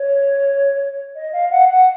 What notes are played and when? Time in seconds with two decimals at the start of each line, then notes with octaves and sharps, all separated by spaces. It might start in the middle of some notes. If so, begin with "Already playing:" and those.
Already playing: C#5
1.15 D#5
1.33 F5
1.51 F#5
1.69 F#5